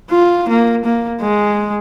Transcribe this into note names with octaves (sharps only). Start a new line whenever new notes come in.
F4
A#3
A#3
G#3